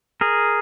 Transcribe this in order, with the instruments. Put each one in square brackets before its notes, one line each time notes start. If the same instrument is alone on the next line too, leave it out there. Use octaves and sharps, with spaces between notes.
[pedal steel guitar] G#4 A#4